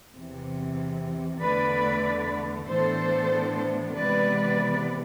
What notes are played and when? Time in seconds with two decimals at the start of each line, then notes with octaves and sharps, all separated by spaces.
0.15 E2 C3 E3
1.42 E2 D3 A3 B4 D5
2.70 A2 E3 B3 D4 A4 C5
3.97 C3 E3 G#3 B3 B4 D5